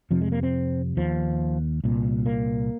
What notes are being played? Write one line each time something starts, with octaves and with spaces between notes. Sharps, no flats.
F2 C3 F3
G#3
A#3
C4
D#2 F3
C2 A#2
A#3